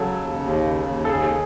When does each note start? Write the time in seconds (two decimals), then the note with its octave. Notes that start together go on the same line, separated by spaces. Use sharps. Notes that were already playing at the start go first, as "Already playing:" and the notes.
Already playing: C#3 F#3 A4
0.16 D#2
0.39 D#2
0.63 C#3
0.86 D#2
1.05 A4
1.09 D#2 G#4